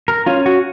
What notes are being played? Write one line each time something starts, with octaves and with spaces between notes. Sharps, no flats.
A#4
C#4 F4
F#4